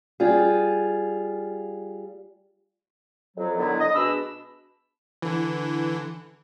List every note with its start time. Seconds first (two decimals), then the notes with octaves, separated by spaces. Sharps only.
0.20 G3 F4 G#4
3.37 F2 F#3
3.57 D3 D#3 F#3 B3 E4
3.79 D#5
3.94 B2 G#3 D4 B5 E6
5.22 D3 E3